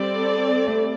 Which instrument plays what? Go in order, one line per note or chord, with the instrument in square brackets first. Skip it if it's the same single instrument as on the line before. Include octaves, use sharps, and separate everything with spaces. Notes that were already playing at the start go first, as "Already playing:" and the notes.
Already playing: [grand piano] G3 [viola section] C4 A4 D5
[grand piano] A3